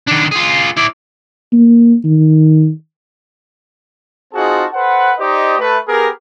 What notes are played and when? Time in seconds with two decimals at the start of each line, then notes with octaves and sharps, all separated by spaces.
0.08 D#3 D4
0.32 F4 G#4
0.77 E4 D5
1.53 A#3
2.05 D#3
4.34 C4 D#4 F4 F#4 G#4 A5
4.74 A4 B4 C5 F#5
5.18 D#4 G4 C5 D5 D#5
5.59 A3 B4
5.87 B3 G4 G#4 A#4